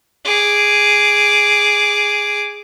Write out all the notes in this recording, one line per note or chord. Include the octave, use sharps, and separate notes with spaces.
G#4 D6